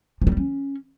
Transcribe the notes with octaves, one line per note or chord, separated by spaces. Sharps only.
F3
F#3
G3
C#4